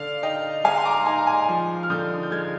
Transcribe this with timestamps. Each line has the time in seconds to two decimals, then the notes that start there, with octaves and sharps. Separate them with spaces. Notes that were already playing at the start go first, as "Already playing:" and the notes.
Already playing: D3 D5 F5
0.22 D#4 D#5 G5
0.64 G#3 F5 G#5
0.78 C6
0.85 A#5 D6
1.06 D#4 G#5 C6
1.18 A#5
1.27 G#5 C6
1.49 F3
1.83 F6
1.90 D3 D#6 G6
2.23 G6
2.31 G#3 F6 G#6